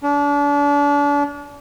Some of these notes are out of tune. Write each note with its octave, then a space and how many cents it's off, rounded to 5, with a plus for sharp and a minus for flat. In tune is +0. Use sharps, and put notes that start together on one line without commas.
D4 -35